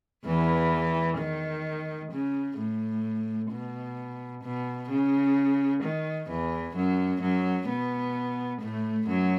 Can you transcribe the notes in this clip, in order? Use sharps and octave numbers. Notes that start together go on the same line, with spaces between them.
E2 E3
D#3
C#3
A2
B2
B2
C#3
D#3
E2 E3
F#2 F#3
F#2 F#3
B2 B3
A2 A3
F#2 F#3